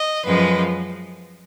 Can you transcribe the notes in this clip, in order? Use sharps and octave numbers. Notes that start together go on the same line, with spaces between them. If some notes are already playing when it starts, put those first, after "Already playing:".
Already playing: D#5
F#2 F3 G#3 B4